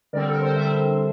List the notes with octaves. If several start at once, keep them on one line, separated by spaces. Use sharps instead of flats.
D3 G3 C4 A#4 D5
A4
A#4
A4 C5
D3 G3 C4 C5 E5